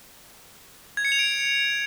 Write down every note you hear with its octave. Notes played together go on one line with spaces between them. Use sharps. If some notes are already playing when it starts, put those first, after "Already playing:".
G#6
C#7
F7
D7